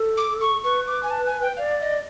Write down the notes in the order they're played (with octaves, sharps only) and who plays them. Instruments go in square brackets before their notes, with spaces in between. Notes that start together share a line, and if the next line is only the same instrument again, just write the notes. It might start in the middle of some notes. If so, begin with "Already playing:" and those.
Already playing: [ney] A4
[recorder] D6
C#6
[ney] B4 [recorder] C#6
[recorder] D6
G#5
A5
G#5
G5
[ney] D5 [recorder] F5
[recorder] D#5